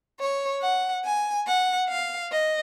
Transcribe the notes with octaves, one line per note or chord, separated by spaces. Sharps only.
C#5
F#5
G#5
F#5
F5
D#5